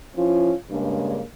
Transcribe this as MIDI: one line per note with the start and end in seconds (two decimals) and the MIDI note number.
0.16 0.52 53
0.16 0.52 61
0.16 0.52 64
0.16 0.52 65
0.70 1.22 43
0.70 1.22 49
0.70 1.22 56
0.70 1.22 58
0.70 1.22 62